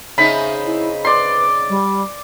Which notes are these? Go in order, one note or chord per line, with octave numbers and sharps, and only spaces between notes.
C#3 C4 D#4 E5 B5
E4
B4 D5 C6
G3